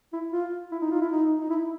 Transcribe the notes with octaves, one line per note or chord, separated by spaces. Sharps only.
E4
F4
E4
D#4
F4
E4
D#4
D#4
E4